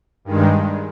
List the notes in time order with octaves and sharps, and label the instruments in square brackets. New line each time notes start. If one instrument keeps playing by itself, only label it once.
[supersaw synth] G2 D#3 G#3